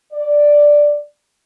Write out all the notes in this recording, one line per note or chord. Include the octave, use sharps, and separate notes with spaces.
D5